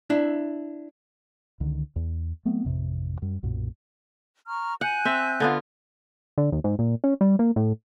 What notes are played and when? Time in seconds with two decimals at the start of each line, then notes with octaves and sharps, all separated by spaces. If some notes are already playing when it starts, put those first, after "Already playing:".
0.10 D4 E4 E5
1.60 C#2 D3 D#3
1.96 E2
2.45 F#3 A3 B3 C4
2.65 A1 F2 C3
3.22 F#2 G3
3.43 B1 F#2 A#2
4.46 A#5 C#6 F6
4.81 F#5 G#5 F#6 G6
5.05 C4 E5
5.40 D3 B3 F4
6.38 D3
6.52 D#2
6.64 G#2
6.79 A#2
7.04 C#4
7.21 G3
7.39 A#3
7.56 A2